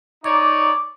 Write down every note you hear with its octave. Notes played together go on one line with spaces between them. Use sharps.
D#4 C#5 D5 D6